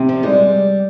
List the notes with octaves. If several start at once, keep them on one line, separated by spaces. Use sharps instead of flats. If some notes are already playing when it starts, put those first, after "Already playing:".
Already playing: C3
F3
G3 G#3